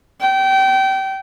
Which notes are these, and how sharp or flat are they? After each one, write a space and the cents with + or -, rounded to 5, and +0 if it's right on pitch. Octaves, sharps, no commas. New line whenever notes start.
G5 -25